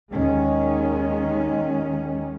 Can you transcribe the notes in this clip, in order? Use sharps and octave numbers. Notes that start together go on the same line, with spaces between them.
D#2 D#3 G#3 C#4